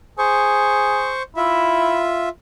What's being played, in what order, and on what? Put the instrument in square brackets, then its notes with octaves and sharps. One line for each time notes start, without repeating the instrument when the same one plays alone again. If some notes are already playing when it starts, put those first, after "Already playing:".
[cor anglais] G#4 [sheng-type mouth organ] C5 C#6
[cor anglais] E4 [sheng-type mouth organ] F4 E5